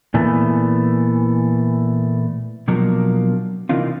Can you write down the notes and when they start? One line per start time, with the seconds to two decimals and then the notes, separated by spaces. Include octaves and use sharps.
0.14 A#2 E3 A3 B3
2.68 B2 F3 F#3 A#3 D4
3.69 C3 E3 A#3 D4 D#4 F4